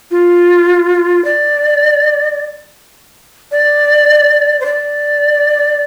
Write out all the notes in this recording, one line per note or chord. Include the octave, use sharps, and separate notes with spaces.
F4
D5
D5
C5
D5